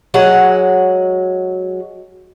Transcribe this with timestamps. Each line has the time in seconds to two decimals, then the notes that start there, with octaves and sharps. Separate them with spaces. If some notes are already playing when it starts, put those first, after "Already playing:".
0.14 F#3 G#3 F#5